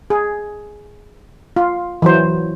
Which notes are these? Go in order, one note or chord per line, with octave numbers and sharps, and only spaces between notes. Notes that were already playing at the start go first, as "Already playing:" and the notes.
G#4
F4
E3 F#3 C5